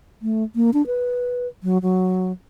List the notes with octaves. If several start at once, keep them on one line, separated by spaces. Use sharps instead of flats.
A3
A#3
D4
B4
F#3
F#3